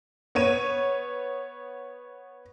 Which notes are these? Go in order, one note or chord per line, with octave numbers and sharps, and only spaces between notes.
B3 C#5 D#7